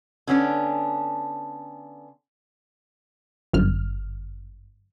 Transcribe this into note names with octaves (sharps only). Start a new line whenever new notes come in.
D3 B3 C#4 D4
G1 F#2 F6